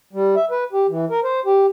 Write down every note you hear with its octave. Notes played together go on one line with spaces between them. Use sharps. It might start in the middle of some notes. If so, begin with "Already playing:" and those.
G3
E5
B4
G4
E3
A#4
C5
G4